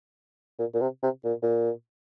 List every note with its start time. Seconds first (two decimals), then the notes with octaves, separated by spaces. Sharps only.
0.59 A#2
0.74 A#2
0.81 C3
1.03 C3
1.25 A#2
1.43 A#2